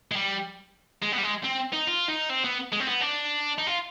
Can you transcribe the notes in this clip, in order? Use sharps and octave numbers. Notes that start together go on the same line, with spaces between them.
G#3
G3
G#3
B3
G3
G#3
C4
D#4
F4
D#4
C4
B3
G#3
C4
B3
D4
D#4
F4